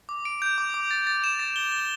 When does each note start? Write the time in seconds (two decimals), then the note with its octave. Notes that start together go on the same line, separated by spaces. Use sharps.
0.09 D6
0.25 D7
0.42 G6
0.58 D6
0.74 D6
0.91 A6
1.07 A6
1.24 E7
1.40 A6
1.56 G7
1.72 G7